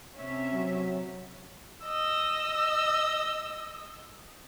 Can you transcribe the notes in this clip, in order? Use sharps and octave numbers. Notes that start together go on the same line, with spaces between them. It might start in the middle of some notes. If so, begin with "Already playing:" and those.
C3 C#4 E5
F#3
D#5 E6